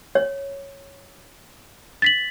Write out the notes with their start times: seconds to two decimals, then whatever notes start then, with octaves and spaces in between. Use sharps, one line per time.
0.15 C#5
2.02 A6 B6 F#7